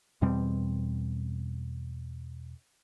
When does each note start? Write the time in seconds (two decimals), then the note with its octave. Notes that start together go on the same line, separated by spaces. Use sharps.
0.22 E2 B2 G3 C4